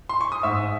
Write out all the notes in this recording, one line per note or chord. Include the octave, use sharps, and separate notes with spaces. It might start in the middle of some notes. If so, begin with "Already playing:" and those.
C6
C#6
D#6
G#2 E5 E6